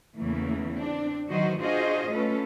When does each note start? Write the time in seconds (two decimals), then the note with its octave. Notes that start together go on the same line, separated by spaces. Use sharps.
0.17 E2 C#3 E3 A3 A#3
0.77 C4 D4
1.30 D#3 E3 F#3 F#4 C5 D#5
1.60 D4 F4 F#4 G#4 C5 D#5
2.10 A3 C#4 F4 A4 B4